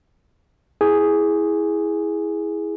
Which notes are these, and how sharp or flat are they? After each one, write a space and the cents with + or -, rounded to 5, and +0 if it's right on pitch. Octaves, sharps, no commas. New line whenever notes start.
E4 -10 G#4 +0